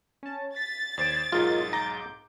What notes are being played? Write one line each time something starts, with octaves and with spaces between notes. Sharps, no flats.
C#4 A5
A6 B6
D#2 C5 D5 G#6 D7 E7
B1 G#2 D#4 F4 G#4 A#4 C#5
A#5 D6 G6